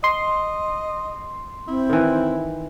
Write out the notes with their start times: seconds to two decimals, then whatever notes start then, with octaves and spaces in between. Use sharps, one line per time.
0.04 D#5 C6
1.68 C4 E4
1.89 D#3 E3